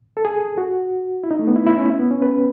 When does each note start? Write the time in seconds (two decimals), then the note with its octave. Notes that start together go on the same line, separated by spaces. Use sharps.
0.17 A4
0.25 G#4
0.58 F#4
1.23 E4
1.31 D#4
1.39 A3
1.47 B3
1.56 E4
1.67 E4
1.77 C#4
1.99 B3
2.11 C#4
2.22 B4